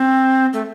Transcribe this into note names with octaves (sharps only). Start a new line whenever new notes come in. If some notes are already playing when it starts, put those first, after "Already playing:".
Already playing: C4
A3